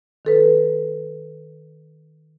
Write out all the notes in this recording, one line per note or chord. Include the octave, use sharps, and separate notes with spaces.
D#3 A4 B4